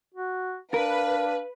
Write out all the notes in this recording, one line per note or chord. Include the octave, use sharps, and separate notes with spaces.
F#4
D4 A#4 B4 F5